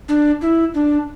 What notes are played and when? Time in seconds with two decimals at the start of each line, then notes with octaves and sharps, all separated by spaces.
0.09 D4
0.41 E4
0.74 D4